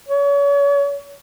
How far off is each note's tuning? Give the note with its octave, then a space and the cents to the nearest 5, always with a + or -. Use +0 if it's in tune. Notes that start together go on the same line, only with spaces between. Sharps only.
C#5 +35